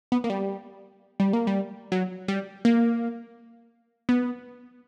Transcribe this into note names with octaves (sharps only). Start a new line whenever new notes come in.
B3
A#3
G3
G3
A#3
G3
F#3
G3
A#3
B3